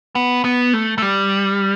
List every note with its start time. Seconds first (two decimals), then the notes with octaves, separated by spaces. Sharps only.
0.15 B3
0.44 B3
0.73 A3
0.98 A3
1.02 G3